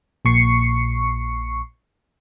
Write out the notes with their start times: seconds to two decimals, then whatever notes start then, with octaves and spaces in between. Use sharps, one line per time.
0.25 A#1 A#2 C#6 C7 C#7